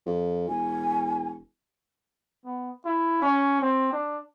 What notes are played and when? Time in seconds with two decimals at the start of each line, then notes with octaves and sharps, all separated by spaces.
0.06 F2
0.48 E1 G#5
2.45 B3
2.85 E4
3.22 C#4
3.61 C4
3.93 D4